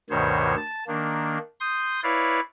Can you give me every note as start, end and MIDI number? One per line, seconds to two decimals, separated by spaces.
0.10 0.55 38
0.10 0.55 43
0.10 0.55 47
0.10 0.55 51
0.10 0.55 72
0.10 0.55 73
0.56 0.84 81
0.87 1.38 51
0.87 1.38 58
0.87 1.38 62
1.60 2.00 84
1.60 2.00 87
1.60 2.00 91
2.03 2.40 64
2.03 2.40 71
2.03 2.40 73
2.03 2.40 74
2.03 2.40 77